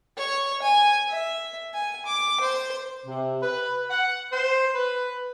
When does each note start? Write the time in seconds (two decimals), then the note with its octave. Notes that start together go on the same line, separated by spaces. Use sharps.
0.17 C#5
0.62 G#5
1.09 E5
1.74 G#5
2.06 D6
2.40 C5
3.06 C3
3.41 B4
3.91 F#5
4.33 C5
4.75 B4